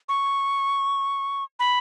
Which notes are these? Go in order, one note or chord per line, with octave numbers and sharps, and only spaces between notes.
C#6
B5